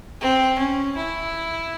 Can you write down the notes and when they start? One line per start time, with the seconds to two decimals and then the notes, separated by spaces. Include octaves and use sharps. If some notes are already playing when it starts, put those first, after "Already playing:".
0.21 C4
0.58 C#4
0.96 E4